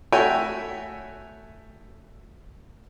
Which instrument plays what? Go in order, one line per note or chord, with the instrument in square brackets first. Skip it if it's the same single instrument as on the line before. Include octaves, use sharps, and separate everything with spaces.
[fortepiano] A3 F#4 C#5 E5 G5 G#5